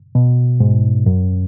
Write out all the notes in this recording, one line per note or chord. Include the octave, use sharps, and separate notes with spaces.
B2
G#2
F#2